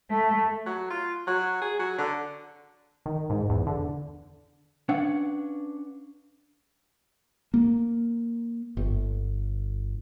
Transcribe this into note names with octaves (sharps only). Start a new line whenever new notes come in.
A3
F#3
F4
F#3
G#4
F#3
D3
D#3
G#2
E2
D3
C#4 D4 B4 F5 F#5
A#3
G1